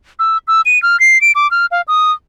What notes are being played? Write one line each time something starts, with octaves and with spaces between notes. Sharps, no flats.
E6
E6
D#7
F6
C7
D7
D6
F6
F5
D#6